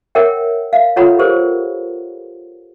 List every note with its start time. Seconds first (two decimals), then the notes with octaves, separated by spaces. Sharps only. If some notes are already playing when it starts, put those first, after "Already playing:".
0.15 A#4 C#5 E5 F#5 G5
0.73 E5 F5
0.96 F4 A4 C#5 F#5 A#5 B5
1.19 G4 G#4 A#4 C5